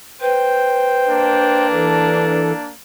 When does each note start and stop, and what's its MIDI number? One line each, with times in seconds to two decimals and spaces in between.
0.21 2.40 71
0.21 1.67 72
0.21 1.67 79
1.08 2.71 58
1.08 2.71 62
1.71 2.53 52
1.71 2.53 69